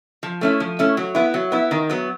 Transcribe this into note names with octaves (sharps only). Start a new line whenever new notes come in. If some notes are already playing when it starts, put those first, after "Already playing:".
F3
A3 C#4 E4
F3
A3 C#4 E4
F#3
B3 E4
F#3
B3 E4
D#3
F#3 B3